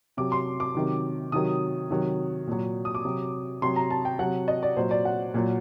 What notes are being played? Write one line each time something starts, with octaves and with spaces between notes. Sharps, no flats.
C3 F#3 D6
C6
D6
C3 D#3 F#3
C3 D#3 F#3 D#6
C3 D#3 F#3
A#2 F#3
D#6
D6
C3 F#3
C3 F#3 C6
A#5
A5
G5
C3 F#3 F#5
D#5
D5
A#2 F#3 C5
D5
F#5
A#2 F#3